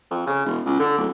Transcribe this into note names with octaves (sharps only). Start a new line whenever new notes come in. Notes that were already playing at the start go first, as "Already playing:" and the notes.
F2
C#3
E1
C#2
D3
D1